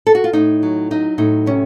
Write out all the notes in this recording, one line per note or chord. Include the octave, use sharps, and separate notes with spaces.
A4
F#4
F4
A2 D#4
F#3
F#3 D#4
A2 D#4
C3 C#4